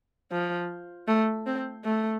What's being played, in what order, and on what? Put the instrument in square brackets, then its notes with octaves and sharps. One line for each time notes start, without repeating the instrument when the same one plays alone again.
[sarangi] F3
A3
C4
A3